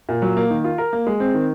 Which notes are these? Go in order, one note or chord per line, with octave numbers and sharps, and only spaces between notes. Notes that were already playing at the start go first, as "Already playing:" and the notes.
A#2
F#3
A#3
D#3
F4
A#4
A#3
G#3
C4
D#3